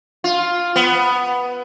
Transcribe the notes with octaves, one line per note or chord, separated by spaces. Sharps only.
F4
B3